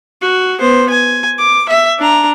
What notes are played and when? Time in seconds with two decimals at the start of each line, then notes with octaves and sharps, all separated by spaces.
0.22 F#4
0.59 B3 C5
0.90 G#5
1.38 D6
1.69 E5
1.99 D4 A#5